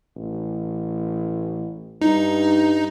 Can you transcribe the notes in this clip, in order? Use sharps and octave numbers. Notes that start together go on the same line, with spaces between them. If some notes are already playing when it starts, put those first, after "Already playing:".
A1
G2 D#4